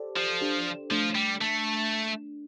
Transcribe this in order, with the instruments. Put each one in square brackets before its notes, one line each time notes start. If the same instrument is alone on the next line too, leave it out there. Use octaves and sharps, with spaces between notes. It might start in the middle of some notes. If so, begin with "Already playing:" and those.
Already playing: [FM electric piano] G4 A4 C5 D5
[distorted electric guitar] F3 [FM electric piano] G4 C5
[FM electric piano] D4 G4
[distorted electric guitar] F3 [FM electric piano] A3 D4
[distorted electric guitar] G3
A3